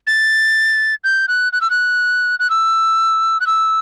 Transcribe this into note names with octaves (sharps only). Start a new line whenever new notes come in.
A6
G6
F#6
F#6
E6
F#6
F#6
E6
F#6
E6